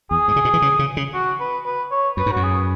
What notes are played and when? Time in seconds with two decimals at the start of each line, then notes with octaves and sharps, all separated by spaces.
0.10 E2 G#4
0.28 G#2
0.36 C#3
0.45 B2
0.54 E3
0.62 C#3
0.79 C#3
0.97 C#3
1.14 F#4
1.40 B4
1.65 B4
1.91 C#5
2.17 F#2 B4
2.26 G#2
2.32 F#2 F#4
2.43 G#4